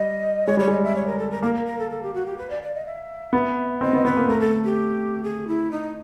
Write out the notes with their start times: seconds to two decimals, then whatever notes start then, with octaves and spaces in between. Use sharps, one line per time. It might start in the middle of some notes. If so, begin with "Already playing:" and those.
Already playing: G3 D#5
0.46 G#3 C#5
0.57 G3 C#5
0.68 G#3 D#5
0.83 E5
0.95 C#5
1.06 A#4
1.18 A4
1.30 A#4
1.42 A#3 A#4
1.55 A#4
1.66 A#4
1.78 A4
1.90 A4
2.03 G4
2.14 F#4
2.25 G4
2.37 B4
2.50 D5
2.62 D5
2.74 D#5
2.85 E5
3.33 B3
3.81 C4 D#5
3.93 B3
4.05 B3 B4
4.17 A#3
4.28 A3 A#4
4.40 A4
4.64 G4
5.23 G#4
5.47 E4
5.71 D#4